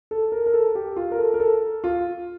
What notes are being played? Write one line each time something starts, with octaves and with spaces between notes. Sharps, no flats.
A4
A#4
A#4
A4
G4
F4
A#4
A4
A#4
A4
F4